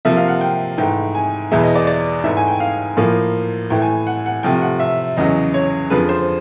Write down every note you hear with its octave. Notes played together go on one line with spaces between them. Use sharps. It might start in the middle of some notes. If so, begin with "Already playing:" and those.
C3 F3 A#3 E5
F5
F#5
G5
G#2 E3 A3 G5
G#5
E2 B2 G#3 E5
D#5
D5
D5
G#2 E3 A3 E5
G#5
G5
F5
A2 F3 A#3
A2 E3 A3 G5
G#5
F#5
F#5
C3 F3 A3 G5
F#5
E5
E2 C#3 F#3 D#5
C#5
F2 D3 F3 G#3 B4
C5